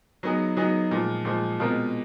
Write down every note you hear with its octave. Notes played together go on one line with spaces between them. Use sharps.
F#3 B3 D#4 G#4
F#3 B3 D#4 G#4
A#2 F3 G#3
A#2 F3 G#3
B2 G#3 C4 F4 A#4